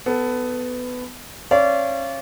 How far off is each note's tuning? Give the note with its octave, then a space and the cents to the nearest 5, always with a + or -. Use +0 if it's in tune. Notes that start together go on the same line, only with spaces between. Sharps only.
B3 +15 A4 +0
C#4 -25 D5 -30 F5 -35